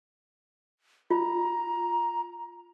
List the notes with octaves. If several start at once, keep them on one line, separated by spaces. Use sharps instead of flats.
F4 A#5